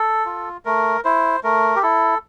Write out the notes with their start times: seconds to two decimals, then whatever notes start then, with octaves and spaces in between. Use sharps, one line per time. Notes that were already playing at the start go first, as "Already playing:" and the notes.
Already playing: A4
0.26 F4
0.65 A3 A#4
1.05 E4 C5
1.44 A3 A#4
1.76 G4
1.82 E4 A4